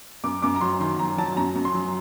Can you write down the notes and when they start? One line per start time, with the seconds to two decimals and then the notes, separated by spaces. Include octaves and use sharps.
0.24 F#2 D6
0.42 F#2 D6
0.56 A#5
0.61 F#3 C6
0.80 D#3 C6
0.99 F#3 A#5
1.18 F#3 A5
1.37 F#2 A#5
1.55 F#2
1.65 C6
1.74 F#3